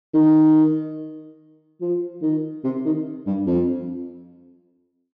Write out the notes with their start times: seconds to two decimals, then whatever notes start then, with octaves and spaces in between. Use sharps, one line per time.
0.14 D#3
1.81 F3
2.22 D#3
2.64 C3
2.85 D#3
3.26 G2
3.47 F2